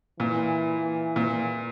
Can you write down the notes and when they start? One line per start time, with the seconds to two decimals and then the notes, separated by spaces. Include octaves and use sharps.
0.19 A#2 E3
1.16 A#2